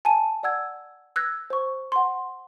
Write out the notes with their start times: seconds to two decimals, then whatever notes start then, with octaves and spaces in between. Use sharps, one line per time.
0.05 G#5 A5 D#7
0.43 D5 F#5 E6 G#6
1.16 E6 F#6 G#6 A#6
1.50 C5 C#6
1.92 F#5 C6